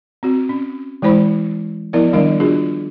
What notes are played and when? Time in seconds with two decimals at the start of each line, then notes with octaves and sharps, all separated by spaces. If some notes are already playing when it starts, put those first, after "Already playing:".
0.23 C4 F#4
0.49 C#4
1.02 E3 G#3 E4 C5 B5
1.93 F3 B3 E4 A#4 D5
2.13 D#3 G3 D4 A#4 D#5
2.40 D4 F4 F#4 G#4